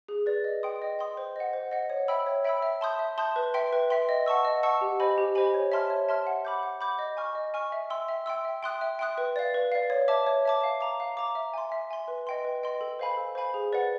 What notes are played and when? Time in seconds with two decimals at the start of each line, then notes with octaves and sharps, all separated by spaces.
0.08 G#4
0.26 B4 D5
0.44 D#5
0.63 G5 C6 D#6
0.82 D#5
0.99 G5 C6 D#6
1.17 C5
1.36 D#5 F#5
1.53 C5
1.71 D#5 F#5
1.90 C#5
2.08 E5 G5 B5 E6
2.26 C#5
2.44 E5 G5 B5 E6
2.62 E5
2.81 A5 C6 D#6 G6
2.99 E5
3.18 A5 C6 D#6 G6
3.36 B4
3.54 E5 G5 C6
3.73 B4
3.90 E5 G5 C6
4.09 D#5
4.26 F#5 A5 C#6 E6
4.45 D#5
4.63 F#5 A5 C#6 E6
4.81 G4
5.00 C5 D#5 G#5 B5
5.18 G4
5.35 C5 D#5 G#5 B5
5.54 C#5
5.72 E5 A5 C6 F6
5.90 C#5
6.09 E5 A5 C6 F6
6.27 F#5
6.45 B5 D6 G6
6.63 F#5
6.81 B5 D6 G6
6.99 D#5
7.17 G#5 C#6 F6
7.35 D#5
7.54 G#5 C#6 F6
7.72 E5
7.90 G5 C6 E6
8.08 E5
8.26 G5 C6 E6
8.45 E5
8.63 G5 C6 D#6 F#6
8.81 E5
8.99 G5 C6 D#6 F#6
9.18 B4
9.36 D5 F5
9.54 B4
9.72 D5 F5
9.90 C#5
10.08 E5 A5 D6
10.27 C#5
10.45 E5 A5 D6
10.63 F5
10.81 A#5 D6
11.00 F5
11.17 A#5 D6
11.35 E5
11.54 G#5 C6
11.72 E5
11.91 G#5 C6
12.08 B4
12.27 D#5 G5 C6
12.45 B4
12.63 D#5 G5 C6
12.81 A4
12.99 C5 F5 G#5 B5
13.17 A4
13.35 C5 F5 G#5 B5
13.54 G#4
13.73 B4 D5 F#5